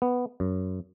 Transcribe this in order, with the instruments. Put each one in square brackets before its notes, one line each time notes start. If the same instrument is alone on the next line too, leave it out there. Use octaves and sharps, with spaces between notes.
[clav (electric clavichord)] B3
F#2